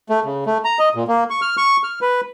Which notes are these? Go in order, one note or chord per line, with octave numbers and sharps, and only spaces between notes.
A3
C#3
A3
A#5
D#5
A#2
A#3
C#6
F6
C#6
F6
B4